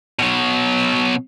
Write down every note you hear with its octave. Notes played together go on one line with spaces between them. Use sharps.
B2 F#3